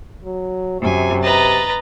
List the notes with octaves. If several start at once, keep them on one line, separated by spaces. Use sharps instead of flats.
F#3
F#2 C3 G#5
B4 D#5 A#5 A6